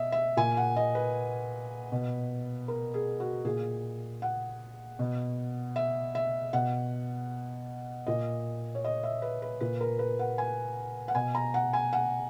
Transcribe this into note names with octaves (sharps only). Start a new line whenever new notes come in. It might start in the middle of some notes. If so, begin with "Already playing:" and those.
Already playing: B2 D#5 E5
E5
A#2 G#5
F#5
D#5
B4
B2
A#4
G#4
F#4
A#2 G#4
F#5
B2
E5
E5
B2 F#5
A#2 D#5
C#5
D#5
E5
B4
B4
A#2 B4
A#4
B4
F#5
G#5
F#5
B2 G#5
A#5
F#5
G#5
F#5